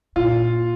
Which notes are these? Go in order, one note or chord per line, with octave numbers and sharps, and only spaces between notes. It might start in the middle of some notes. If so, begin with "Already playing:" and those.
A#2 F4